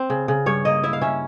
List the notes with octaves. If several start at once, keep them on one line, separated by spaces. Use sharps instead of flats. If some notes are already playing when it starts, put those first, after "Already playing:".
Already playing: C4
C#3
C#3
G2 C#5
A#3 D#5
E4 E5
F5
C#4 E5